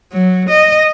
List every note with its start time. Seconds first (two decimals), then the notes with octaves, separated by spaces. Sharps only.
0.12 F#3
0.49 D#5